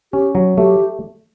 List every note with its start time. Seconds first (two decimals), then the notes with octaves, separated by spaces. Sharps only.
0.13 C#4 G4
0.35 F#3
0.57 A3 G4